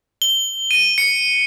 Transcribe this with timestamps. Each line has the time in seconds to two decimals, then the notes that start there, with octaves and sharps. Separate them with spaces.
0.22 G7
0.71 D#7
0.98 C#7